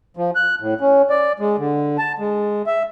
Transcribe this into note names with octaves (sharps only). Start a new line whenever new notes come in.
F3
F#6
A2
C#4
D5
G#3
D3
A5
G#3
E5